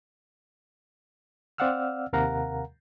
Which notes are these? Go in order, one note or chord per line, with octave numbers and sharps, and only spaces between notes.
C4 D5 F5 F#5 E6 F6
D#2 C3 A#4 F5 F#5 A#5